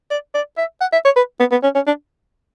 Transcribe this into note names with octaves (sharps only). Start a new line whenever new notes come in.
D5
D5
E5
F#5
E5
C#5
B4
B3
B3
C#4
C#4
D4